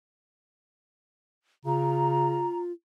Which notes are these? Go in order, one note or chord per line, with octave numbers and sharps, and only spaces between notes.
C#3 F4 A#5